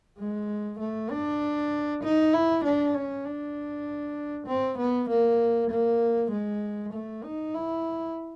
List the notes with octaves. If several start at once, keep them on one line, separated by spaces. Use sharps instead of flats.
G#3
A3
D4
D#4
E4
D4
C#4
D4
C4
B3
A#3
A#3
G#3
A3
D#4
E4